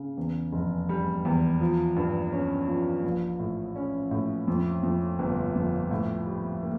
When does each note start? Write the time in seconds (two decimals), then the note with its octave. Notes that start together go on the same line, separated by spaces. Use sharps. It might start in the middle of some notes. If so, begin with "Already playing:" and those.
Already playing: C#3
0.17 E2
0.53 F1
0.89 G3
1.25 E2
1.60 F3
1.96 G2
2.32 C#4
2.68 F3
3.04 A#1
3.39 A2
3.76 C#4
4.11 A2
4.48 F2
4.83 F2
5.19 G1
5.56 F2
5.91 A2
6.26 G3
6.63 A#3